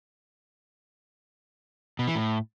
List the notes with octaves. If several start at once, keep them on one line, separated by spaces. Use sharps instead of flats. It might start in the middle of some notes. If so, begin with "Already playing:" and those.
B2
E3
A2